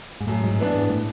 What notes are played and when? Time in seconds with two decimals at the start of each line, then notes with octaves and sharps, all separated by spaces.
0.21 G#2
0.27 F#2 A2
0.44 G#2
0.59 E3 B3 D4
0.75 G#2
0.89 A2